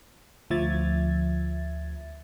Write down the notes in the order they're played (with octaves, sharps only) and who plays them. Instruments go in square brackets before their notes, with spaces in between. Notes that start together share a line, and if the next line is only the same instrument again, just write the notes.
[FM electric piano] D2 F3 E5 G#6 A6